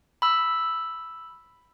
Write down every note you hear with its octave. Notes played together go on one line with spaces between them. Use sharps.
B5 E6